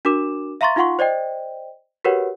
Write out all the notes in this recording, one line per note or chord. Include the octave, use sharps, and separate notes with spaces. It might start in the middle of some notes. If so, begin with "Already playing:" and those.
D4 F#4 A#4 D6 E7
E5 F5 A#5 C6 C#6 A6
D#4 F4 F5 F#5 C6 C#6
C5 D5 D#5 G5
F#4 G4 A#4 B4 C#5 F#5